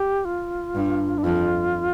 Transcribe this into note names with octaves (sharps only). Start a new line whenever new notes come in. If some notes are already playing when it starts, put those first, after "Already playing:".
Already playing: G4
F4
G2
D4
F2 F4